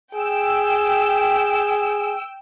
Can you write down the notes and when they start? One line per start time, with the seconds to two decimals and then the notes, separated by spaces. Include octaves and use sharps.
0.15 G#4 G5 E6